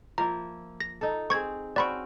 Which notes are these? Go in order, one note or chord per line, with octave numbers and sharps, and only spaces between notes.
F3 A#3 E4 A#5
A#6
D#4 A4
C4 G#4 C#6 G#6
C4 C#4 F#4 D5 B5 C#6